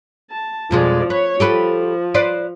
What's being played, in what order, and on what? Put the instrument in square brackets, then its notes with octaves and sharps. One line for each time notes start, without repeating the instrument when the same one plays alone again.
[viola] A5
[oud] F2 B2 G#3 [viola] F3 D5
[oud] B4 [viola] C#5
[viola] F3 [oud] G4 A4 B4
[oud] B4 C5 D5